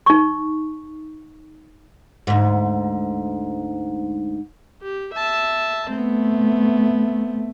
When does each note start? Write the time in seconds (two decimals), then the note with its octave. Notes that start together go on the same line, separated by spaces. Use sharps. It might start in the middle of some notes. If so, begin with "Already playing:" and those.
0.06 D#4 C#6
2.27 D2 G#2
4.82 G4
5.13 E5 A5
5.90 A3 B3 C4